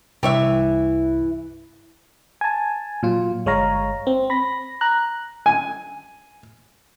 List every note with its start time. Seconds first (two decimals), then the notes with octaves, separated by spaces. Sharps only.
0.23 C2 G2 E3 G4 C#5 E5
2.41 G#5 A5
3.03 A#2 F#3 F4
3.46 G1 G#3 C#5 F5 A#5
4.07 C4
4.30 B5 A#6
4.81 A#5 F#6
5.46 G#5